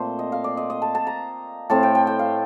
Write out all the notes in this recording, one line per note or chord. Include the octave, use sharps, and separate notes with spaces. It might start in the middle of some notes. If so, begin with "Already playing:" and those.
Already playing: A#2 A3 C4 C5
D#5
F5
D5
D#5
D#5
A5
A5
A#5
A2 A3 C4 A5
G5
G5
G5
F5